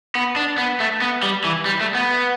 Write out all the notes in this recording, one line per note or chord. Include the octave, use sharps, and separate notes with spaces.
B3
D4
B3
A3
B3
G3
E3
G3
A3
B3